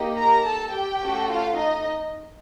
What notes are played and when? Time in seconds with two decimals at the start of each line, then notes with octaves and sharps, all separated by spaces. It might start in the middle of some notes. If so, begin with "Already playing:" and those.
Already playing: A#3 D#4 G4
0.16 A#4 A#5
0.45 A4 A5
0.73 G4 G5
1.01 A3 C#4 F#4 A4
1.29 F4 F5
1.57 D#4 D#5